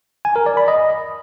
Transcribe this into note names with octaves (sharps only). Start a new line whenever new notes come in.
G#5
A#4
D5
B5
D#5